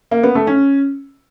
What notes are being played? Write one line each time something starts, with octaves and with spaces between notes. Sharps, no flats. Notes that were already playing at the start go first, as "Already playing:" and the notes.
A#3
B3
A3
C#4